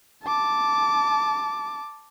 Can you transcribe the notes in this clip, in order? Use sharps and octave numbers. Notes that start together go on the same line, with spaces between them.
A5 D6